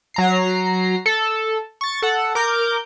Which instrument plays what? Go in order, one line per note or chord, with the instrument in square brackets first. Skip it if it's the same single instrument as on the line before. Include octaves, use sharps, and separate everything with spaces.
[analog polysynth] F#3 A#5 C7
A4
C#6 A6
A4 F#5
A#4 D6 G6